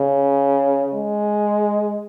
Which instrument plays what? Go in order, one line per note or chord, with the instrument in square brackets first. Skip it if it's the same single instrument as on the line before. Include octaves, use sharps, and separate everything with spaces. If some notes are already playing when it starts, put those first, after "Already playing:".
Already playing: [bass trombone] C#3
G#3